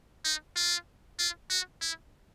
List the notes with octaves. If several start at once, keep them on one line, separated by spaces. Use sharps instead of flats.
D#4
F4
F4
F#4
E4